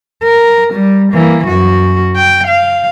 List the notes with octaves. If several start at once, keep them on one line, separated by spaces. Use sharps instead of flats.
A#4
G3
E3 A#3
F#2 F#4
G5
F5